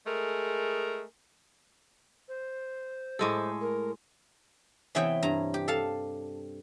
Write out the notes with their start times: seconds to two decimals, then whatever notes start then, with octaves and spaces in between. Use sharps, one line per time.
0.06 G#3 A3 G#4 A#4
2.28 C5
3.19 A2 G#3 A4
3.61 A#4
4.95 C3 E3 B3 C#5 E5 G5
5.23 G2 A#5
5.54 G4
5.68 A4 F5 A5